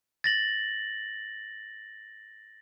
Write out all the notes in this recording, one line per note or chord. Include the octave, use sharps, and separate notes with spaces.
A6 A#6 F#7